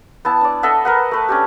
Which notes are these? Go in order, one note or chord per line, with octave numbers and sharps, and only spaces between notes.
B3 E4 A5
D4 D5
A4 D#5 E5 F#5
A#4 B4 F#5
A3 B4
C#4 D4 G4